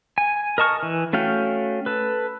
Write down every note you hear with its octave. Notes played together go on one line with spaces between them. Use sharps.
G#5
A#4 D#5 A5 C#6 F6
E3
A3 C#4 F#4 F5 G5
A4 B4